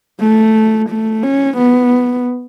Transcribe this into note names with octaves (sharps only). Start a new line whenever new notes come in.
A3
A3
C#4
B3